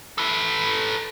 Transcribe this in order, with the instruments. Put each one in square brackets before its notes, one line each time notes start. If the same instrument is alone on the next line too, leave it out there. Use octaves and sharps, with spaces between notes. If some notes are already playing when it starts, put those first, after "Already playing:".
[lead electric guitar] A4 B4